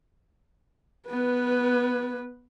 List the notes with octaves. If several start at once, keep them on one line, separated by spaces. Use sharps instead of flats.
B3 B4